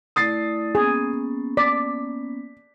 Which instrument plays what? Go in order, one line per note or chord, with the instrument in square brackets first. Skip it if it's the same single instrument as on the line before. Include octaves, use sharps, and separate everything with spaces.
[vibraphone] A3 E4 D5 [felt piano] D#6 A6 C7
[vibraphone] A#3 B3 C#4 [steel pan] G#4
[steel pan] D5 [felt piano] B6